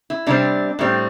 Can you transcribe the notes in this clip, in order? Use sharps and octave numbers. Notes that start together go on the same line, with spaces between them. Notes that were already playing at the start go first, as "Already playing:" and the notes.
E4
C3 G3 C4 D4
A2 G3 C4